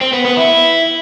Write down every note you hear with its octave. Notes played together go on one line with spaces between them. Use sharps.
C4
B3
B3
E4